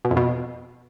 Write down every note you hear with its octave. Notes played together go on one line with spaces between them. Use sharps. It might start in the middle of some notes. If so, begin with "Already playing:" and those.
B2
F2
B2